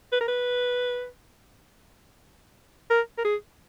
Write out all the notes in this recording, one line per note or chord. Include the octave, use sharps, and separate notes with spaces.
B4
A#4
B4
A#4
A#4
G#4